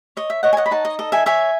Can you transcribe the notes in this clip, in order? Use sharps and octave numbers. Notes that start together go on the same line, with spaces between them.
C#5 D#5
E5
C#5 D#5 F#5
G#5
D#5 F#5
B5
D#4 F#5 A5
D#5
A4 D#5
E5 G#5
C#5 E5 G#5